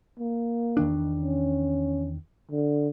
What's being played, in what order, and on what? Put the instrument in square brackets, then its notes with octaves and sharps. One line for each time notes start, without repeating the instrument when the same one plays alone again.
[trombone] A#3
[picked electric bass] E2 D#3 D4
[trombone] C#4
D3